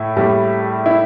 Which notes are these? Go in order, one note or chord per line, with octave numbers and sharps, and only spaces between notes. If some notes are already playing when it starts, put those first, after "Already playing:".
Already playing: A2 E4
A2 G3
E4